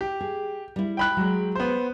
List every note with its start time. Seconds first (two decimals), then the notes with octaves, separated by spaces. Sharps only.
0.01 G4
0.21 G#4
0.76 G3 E4
0.97 G5 B5 F#6
1.17 F#3 G#3
1.55 B3 C5